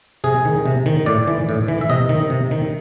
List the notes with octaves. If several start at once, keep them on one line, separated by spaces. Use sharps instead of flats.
C3 G#4
D#3
C3
D#3
A2 D5
E3
A2
E3
E5
C3 D#5
D#3
C3
D#3